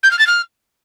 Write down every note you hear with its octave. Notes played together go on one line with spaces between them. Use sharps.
G6
F6
A6
F6